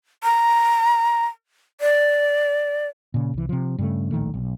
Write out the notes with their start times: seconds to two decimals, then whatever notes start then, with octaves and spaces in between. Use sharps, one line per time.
0.24 A#5
1.81 D5
3.14 A#2 C#3
3.34 C2 E3
3.49 C3 F3
3.78 G2 C#3 A3
4.11 D1 A#1 D#3 A3
4.34 B1